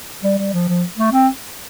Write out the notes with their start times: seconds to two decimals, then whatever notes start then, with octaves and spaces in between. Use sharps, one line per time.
0.23 G3
0.38 G3
0.53 F3
0.68 F3
0.98 A3
1.12 C4